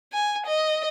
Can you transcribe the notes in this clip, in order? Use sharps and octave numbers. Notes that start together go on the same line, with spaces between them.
G#5
D#5